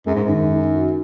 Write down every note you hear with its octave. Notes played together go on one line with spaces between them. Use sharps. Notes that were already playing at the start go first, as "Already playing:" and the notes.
F#2 G#3
G#2
F#2 D#3
D#4
F#4